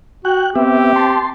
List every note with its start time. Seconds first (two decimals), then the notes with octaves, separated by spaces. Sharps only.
0.25 F#4 G5 F#6
0.56 B3 C4 G4 E5
0.96 A5 C6